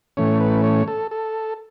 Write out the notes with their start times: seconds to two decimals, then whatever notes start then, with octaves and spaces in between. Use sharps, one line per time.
0.17 A2 E3 A3 C#4 C#5
0.40 B4
0.63 C#5
0.88 A4
1.11 A4